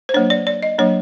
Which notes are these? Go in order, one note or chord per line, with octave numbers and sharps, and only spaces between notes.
C5
F#3 A#3 D4 C#5
D5
D5
D#5
F#3 A#3 D4 C#5